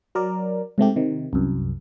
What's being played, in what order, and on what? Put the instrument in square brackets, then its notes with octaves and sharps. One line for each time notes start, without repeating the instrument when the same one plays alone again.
[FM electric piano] F#3 A#4 D5
G#2 C3 A3 G4
C3 D#3
C2 F#2